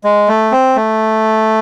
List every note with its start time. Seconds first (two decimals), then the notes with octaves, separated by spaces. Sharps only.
0.04 G#3
0.28 A3
0.52 C4
0.76 A3